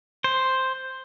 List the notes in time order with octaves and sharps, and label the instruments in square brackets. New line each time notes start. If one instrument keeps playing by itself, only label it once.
[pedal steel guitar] C5